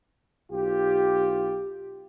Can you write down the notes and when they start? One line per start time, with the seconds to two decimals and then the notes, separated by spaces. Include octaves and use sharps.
0.51 B1 F4 G4